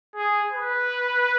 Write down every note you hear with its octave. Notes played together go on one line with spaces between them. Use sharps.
G#4
B4